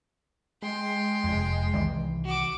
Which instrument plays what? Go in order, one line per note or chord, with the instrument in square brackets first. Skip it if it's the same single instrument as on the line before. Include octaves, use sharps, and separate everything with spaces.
[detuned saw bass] G#3 [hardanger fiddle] G5 C6
[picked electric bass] F1 F2
C2 D#3 E3
[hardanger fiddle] F#4 D6